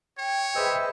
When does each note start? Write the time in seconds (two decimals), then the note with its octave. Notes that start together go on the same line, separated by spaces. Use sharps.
0.18 C#5 G5
0.55 G#4 B4 C5 D#5 E5 E6